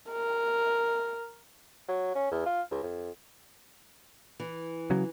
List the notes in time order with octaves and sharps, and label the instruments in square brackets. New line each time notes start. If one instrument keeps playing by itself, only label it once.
[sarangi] A#4
[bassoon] F#3
C#4
E2
F4
C#2
F2
[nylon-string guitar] E3
[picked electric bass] C#3 F#3